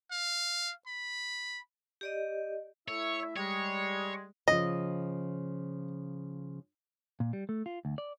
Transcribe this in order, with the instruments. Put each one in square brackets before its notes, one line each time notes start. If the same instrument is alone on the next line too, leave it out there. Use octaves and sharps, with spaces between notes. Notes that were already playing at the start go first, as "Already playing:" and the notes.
[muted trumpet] F5
B5
[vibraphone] G4 D5 D#5
[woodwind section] A3 E4 E5 [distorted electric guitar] C#5
[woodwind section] G3 G#3 [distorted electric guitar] C#5
[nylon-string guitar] C#3 F3 [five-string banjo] D#5
[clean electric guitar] A#2
G3
A3
F4
D2
D5